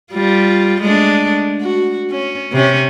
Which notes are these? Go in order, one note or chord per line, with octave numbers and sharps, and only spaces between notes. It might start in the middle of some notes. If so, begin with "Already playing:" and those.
G3 F4
G#3 A3 D4
F#4
C#4
C3 C#4